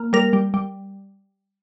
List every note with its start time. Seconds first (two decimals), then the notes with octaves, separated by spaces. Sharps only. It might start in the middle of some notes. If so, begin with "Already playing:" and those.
Already playing: A#3
0.13 G3 A#4
0.33 G3
0.54 G3